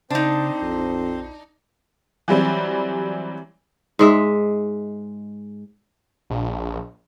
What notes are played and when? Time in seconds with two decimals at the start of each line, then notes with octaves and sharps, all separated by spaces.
0.10 C#3 C4 D4 D#4 C5
0.62 A#1 F2
2.28 E3 F#3 G3 C4
3.99 G#2 G#3 E5
6.30 A#1